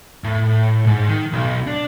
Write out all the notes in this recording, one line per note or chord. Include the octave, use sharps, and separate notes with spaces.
A2
G#2
D#3
B1
D4